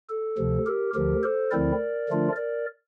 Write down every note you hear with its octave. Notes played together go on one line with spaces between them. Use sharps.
A4
D2 C3 F3
G4 A#4
D2 D3 F3 G4 A#4
A4 C5
D2 D3 F3 C4 E4 A#4 D5
D3 F3 A3 D4 F4
A#4 D5